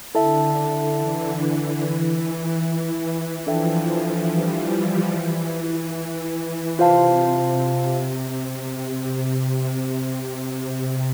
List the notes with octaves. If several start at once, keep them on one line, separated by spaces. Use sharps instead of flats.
D3 E4 A4 E5 A5
E3
E3
F3 D4 A4 E5 G5
G3
F3
E3
C3 F4 C5 F5 A5
C3